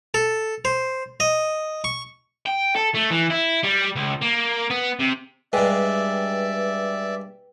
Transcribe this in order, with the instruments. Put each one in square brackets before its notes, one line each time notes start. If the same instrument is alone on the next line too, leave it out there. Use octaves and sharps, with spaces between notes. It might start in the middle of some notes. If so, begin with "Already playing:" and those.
[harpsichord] A4
C5
D#5
C#6
[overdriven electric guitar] G5
A4
A3
E3
E4
G3
C#2
A#3
B3
C3
[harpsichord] G2 G#3 [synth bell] B4 G5 [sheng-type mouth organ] D5 E5